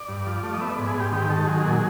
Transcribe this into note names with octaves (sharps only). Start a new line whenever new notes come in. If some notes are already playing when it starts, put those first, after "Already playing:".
Already playing: D5
G2
F3
A3
D#5
B3 E5
D5
G#2
G#4
G#2 G4
D#3 G4
D#3 A4
F#3 G#4
A#2